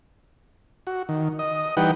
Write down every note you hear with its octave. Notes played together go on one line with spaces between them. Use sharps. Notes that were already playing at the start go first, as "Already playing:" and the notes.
F#4
D#3
D#5
E3 G3 D#4 B4 F#5 G5